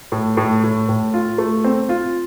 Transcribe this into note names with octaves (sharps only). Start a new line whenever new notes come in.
A2
A2
A2
A2
F4
A3
C4
F4